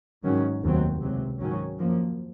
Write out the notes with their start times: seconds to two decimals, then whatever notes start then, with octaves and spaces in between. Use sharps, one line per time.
0.25 G#2 D#3 F#3 C#4
0.62 F1 D#2 D#3 F#3 C4
1.02 C#2 C3 F#3
1.40 G#2 D#3 F#3 C#4
1.79 F#2 F3 A#3